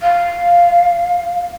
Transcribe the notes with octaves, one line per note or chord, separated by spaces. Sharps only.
F5